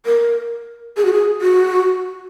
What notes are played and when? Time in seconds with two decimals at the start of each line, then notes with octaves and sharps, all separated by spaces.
0.06 A#4
0.97 G#4
1.05 F#4
1.13 G#4
1.41 F#4